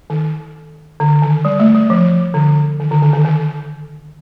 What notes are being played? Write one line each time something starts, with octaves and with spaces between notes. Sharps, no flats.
D#3
D3
D#3
G3
A3
G3
F3
D3
D#3
D3
D#3
D#3
D#3